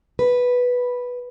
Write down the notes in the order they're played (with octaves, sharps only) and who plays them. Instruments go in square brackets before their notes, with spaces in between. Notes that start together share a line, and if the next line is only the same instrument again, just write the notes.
[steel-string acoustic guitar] B4